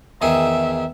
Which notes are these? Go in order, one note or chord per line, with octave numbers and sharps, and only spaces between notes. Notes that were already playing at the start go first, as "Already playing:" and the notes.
E2 D#3 G#4 E5